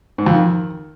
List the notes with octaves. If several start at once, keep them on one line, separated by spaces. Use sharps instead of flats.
G#2
F2
D#3